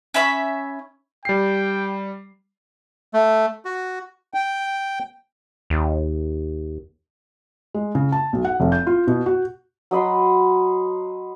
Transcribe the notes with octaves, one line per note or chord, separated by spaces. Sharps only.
C#4 E5 B5 E6
G3 G5 C7
A3
F#4
G5
D#2
G#3
C#3
A5
B1
F#5
F1
G6
F4
B2
F#4
F#3 D#5 B5 C6